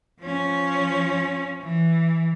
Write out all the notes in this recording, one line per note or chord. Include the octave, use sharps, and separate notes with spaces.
F3 C#4
E3